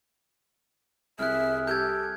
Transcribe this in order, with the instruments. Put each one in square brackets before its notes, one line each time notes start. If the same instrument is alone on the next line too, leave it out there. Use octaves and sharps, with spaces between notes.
[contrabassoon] C2 [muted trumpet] G#4 [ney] E5 [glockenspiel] F6 F#6
[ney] G4 [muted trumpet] A4 [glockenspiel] G6 G#6